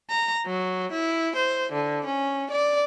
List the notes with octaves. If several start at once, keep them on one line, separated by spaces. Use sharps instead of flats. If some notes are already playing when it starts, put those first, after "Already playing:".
A#5
F#3
E4
C5
D3
C#4
D5